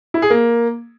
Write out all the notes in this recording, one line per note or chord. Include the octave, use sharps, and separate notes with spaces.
E4
G#4
A#3